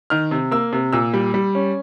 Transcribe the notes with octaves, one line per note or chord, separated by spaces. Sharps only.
D#3 F6
C3
A#3 E6
C3
A#2 E6
G3
G3
C#4